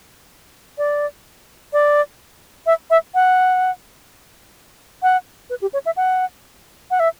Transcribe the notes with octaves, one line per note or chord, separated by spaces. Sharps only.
D5
D5
E5
E5
F#5
F#5
B4
G4
C#5
E5
F#5
F#5
E5